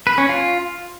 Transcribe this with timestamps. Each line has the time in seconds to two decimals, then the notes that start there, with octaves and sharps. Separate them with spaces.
0.07 B4
0.18 C#4
0.29 F4